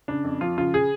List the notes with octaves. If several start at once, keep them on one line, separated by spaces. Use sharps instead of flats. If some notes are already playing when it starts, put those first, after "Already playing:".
C#3 D4
F2
F3 F4
C#3 F4
G#4